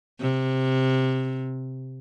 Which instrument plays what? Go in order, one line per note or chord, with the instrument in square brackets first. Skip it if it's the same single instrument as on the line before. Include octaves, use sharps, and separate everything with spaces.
[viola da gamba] C3